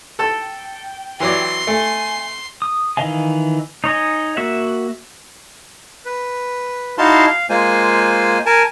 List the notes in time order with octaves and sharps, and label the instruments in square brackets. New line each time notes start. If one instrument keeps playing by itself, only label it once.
[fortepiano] A4 A5 [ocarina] G5
[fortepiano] E3 F#3 D5 [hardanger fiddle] C6
[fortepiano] A3 [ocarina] G#5
[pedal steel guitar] D#6
D#3 E3 D#5 F5 G#5
D#4 C#5 D#5 G#5
A#3 F#4 E5 F#5
[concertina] B4
D#4 E4 F#4 F5 A5 C6
F5
G#3 A#3 F4 C5 G#5
A#4 G#5 A5